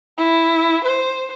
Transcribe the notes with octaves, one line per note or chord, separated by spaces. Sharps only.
E4
C5